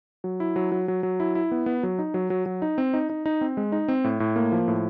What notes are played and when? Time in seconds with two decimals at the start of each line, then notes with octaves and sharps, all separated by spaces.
0.24 F#3
0.40 E4
0.56 F#3
0.72 F#3
0.88 F#3
1.03 F#3
1.20 E4
1.35 E4
1.51 B3
1.66 B3
1.83 F#3
1.99 D#4
2.14 F#3
2.30 F#3
2.46 F#3
2.62 D#4
2.78 C4
2.94 D#4
3.10 D#4
3.26 D#4
3.41 C4
3.57 G#3
3.72 D#4
3.88 C4
4.04 A2
4.20 A2
4.36 A#3
4.52 F3
4.68 A2